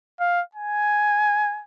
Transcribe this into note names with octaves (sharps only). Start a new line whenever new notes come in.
F5
G#5